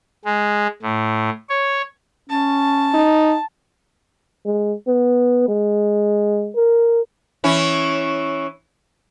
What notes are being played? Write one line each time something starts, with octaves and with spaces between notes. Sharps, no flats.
G#3
A2
C#5
C#4 A5
D#4
G#3
B3
G#3
A#4
E3 C#4 E4